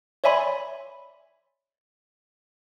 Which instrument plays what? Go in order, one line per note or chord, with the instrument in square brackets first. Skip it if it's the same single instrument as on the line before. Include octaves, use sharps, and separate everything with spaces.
[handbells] C#5 D5 E5 G#5 B5 C6